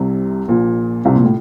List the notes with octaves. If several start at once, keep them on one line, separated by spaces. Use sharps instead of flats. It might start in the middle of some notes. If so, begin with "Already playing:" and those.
Already playing: C2 C3
A#1 A#2
C2 C3
A#1 A#2
A2